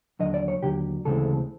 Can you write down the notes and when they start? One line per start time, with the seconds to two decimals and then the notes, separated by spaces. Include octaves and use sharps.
0.19 D#2 D3 F#3 D#5
0.34 D5
0.48 C#5
0.63 D#2 D3 F#3 G4
1.05 D2 C#3 E3 G#3 C4 A4